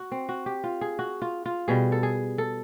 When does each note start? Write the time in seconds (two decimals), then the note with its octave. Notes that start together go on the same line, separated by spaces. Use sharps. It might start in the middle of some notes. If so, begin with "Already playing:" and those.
Already playing: F#4
0.12 C4
0.29 F#4
0.46 G4
0.64 F4
0.81 G#4
0.99 F#4
1.22 F4
1.46 F4
1.68 B2 G3 G#4
1.92 A4
2.03 G#4
2.38 A4